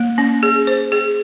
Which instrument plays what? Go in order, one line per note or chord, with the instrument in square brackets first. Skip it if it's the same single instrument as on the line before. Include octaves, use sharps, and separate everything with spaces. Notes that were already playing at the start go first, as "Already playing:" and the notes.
Already playing: [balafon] A#3
C#4
G#4
C5
G#4